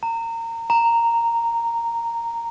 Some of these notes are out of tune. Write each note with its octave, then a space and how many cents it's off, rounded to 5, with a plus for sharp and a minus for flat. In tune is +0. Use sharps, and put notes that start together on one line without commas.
A#5 -25
A#5 -10